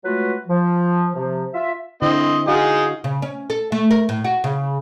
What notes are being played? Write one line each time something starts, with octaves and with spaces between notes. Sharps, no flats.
F#3 G#3 A3 F4 F#4 B4
F3
C3 F3
F4 E5
D3 C4 E4 D#5
D#4 F#4 G#4 F5
C#3
C#4
A4
A3
A#4
A2
F#4
C#3